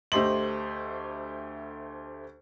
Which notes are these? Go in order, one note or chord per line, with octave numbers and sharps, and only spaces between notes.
D2 A3 G4 C5 D#5 F#7